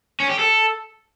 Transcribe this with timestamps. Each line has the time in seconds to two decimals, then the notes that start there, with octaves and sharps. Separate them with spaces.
0.20 C#4
0.29 G4
0.39 A4